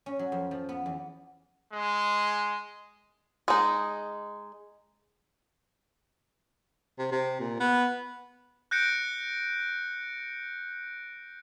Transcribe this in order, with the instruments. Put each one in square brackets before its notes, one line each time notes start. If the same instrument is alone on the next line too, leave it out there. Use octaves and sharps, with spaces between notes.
[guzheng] C#4
F#3
F2
F3
B3
E2
[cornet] G#3
[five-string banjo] G#3 D#4
[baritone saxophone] C3
C3
A#2
B3
[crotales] F#6 G6 A#6 C#7 D7